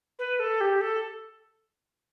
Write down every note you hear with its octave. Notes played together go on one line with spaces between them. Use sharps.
B4
A4
G4
A4